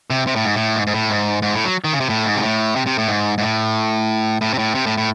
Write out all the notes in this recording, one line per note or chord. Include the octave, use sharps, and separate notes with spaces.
C3
C3
A2
G#2
A2
G#2
G#2
A2
G#2
G#2
A2
F#3
D#3
C#3
C3
A2
G#2
C3
A2
C3
C3
A2
G#2
G#2
A2
A2
C3
A2
C3
A2
A2